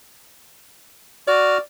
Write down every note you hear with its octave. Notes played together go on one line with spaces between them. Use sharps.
F#4 D5 F6